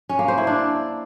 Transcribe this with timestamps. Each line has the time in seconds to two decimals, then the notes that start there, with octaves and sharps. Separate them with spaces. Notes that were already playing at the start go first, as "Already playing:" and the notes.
0.09 C#4
0.19 A#3
0.28 C5
0.38 E4
0.47 D4